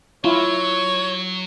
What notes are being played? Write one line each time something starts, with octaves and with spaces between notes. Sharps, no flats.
F#3 E4 F4 C#5